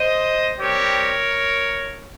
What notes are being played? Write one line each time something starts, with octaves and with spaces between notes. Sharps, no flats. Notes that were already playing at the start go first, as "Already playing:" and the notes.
Already playing: C5 D#5
G3 C4 G4 A#4 C#5